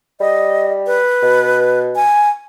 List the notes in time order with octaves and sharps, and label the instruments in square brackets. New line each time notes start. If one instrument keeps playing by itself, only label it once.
[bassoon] G3 [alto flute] D#5
[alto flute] B4
[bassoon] B2
[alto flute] G#5